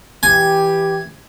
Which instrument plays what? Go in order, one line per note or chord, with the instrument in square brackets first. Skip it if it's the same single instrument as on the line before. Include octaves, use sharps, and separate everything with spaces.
[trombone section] E3 G4 [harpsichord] G#5